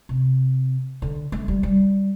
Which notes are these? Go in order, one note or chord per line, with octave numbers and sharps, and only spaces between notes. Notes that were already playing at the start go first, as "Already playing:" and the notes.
C3
D3
A3
G3
G3